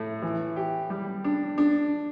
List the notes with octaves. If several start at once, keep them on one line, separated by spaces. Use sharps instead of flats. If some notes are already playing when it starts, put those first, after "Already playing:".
Already playing: A2 A3
E3
G4
G3
D4
D4